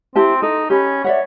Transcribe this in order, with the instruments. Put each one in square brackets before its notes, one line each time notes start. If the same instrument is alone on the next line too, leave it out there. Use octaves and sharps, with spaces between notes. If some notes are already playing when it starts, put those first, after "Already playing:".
[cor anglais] C4 [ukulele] E4 G4 A5
[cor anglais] D#4 [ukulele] A4
[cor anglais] C#4 [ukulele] G4 B5
[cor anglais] C#5 [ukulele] D5 E5 F#5